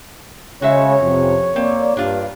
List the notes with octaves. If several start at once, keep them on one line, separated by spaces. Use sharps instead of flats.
C#3 G#3 F#4 C5 C#5 E5
F2 C3
A#3 C4 D5
G2 D4 F4